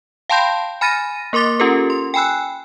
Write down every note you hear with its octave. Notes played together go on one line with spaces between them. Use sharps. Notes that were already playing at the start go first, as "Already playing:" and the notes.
F5 G5 A5 B5 C6 G6
G#5 B5 F6 A6 A#6 D#7
A#3 A#4 C6 D6 A6
C#4 F4 G4 A4 A#4
C6
G5 G#5 B5 E6 F#6